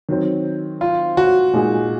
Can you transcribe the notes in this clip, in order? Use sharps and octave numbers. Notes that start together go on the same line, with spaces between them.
D#3 F#3 C4
F4
F#4
A#2 G#3 D#4 G#4